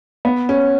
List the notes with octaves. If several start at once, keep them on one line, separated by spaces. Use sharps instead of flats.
B3
C#4